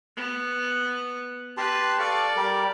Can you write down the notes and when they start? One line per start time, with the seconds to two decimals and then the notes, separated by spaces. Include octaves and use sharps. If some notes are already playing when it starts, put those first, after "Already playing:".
0.17 B3
1.57 G4 B4 A5 C6
1.99 A4 D5 F5 C#6
2.36 G3 G4 A#4